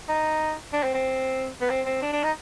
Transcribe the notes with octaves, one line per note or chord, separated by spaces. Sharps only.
D#4
D4
C4
C4
B3
C4
C4
D4
D4
D#4